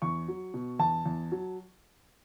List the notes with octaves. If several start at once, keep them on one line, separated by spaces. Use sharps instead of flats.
E2 C#6
F#3
B2
E2 A5
E2
F#3